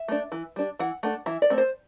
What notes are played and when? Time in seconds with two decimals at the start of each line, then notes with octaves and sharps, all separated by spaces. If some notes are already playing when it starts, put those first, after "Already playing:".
Already playing: E5
0.08 A3 D4
0.32 E3
0.56 G3 D4
0.79 E3 F#5
1.03 A3 D4 F#5
1.26 E3 E5
1.42 D5
1.50 A3 C4
1.58 C5